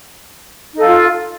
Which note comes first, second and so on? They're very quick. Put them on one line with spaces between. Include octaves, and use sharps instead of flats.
D#4 A4 F5 F4